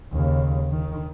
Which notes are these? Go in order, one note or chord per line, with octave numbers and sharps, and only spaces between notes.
D#2 C#3
D#3